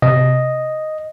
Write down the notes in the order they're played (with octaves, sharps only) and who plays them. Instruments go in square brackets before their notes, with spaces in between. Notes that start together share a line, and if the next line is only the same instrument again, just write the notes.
[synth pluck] C3 [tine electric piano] D#5